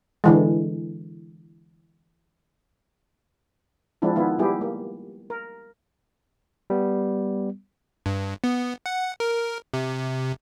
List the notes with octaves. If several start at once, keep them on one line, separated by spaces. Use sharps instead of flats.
D3 E3 G#3
F3 G#3 C4 D4 E4
D#3 B3 E4 F4
G3 B3 E4 G4 G#4
A#3
A#4
G3 B3
G2
B3
F#5
A#4
C3